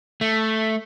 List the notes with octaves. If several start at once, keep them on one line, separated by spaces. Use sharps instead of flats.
A3